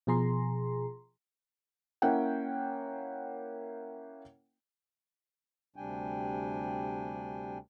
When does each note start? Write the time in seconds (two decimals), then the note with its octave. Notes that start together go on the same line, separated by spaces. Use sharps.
0.07 B2 F3 G#4 A#5 C6
2.02 A#3 C#4 E4 F#5 G5
5.76 D2 C3 G3 D4 G5 G#5